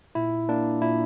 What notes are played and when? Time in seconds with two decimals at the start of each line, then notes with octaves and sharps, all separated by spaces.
0.15 A#2 E4
0.49 A#3 D4
0.81 A#2 E4